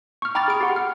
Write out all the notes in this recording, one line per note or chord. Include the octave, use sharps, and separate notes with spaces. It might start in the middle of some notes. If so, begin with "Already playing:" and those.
C#6 F6
G5 A#5 B5 D6 F6 A6
G#4 D7
G4 F#5 C6
F6